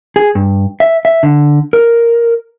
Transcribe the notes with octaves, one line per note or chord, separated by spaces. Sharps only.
G#4
G2
E5
E5
D3
A#4